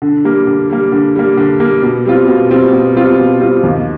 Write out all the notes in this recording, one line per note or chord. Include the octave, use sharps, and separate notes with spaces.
D3
G3 A#3
D3
G3 A#3
D3
G3 A#3
D3
G3 A#3
B2
G3 C4 F4
B2
G3 C4 F4
B2
G3 C4 F4
B2
G3 C4 F4
D#2